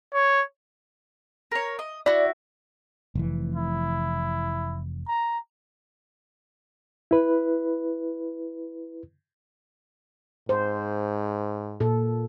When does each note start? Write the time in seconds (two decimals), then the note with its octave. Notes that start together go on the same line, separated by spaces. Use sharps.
0.13 C#5
1.52 A#4 C#5
1.79 D#5
2.06 E4 F#4 D5
3.15 F1 E3
3.55 E4
5.08 A#5
7.11 E4 B4
10.49 G#2 C5
11.80 A#2 A4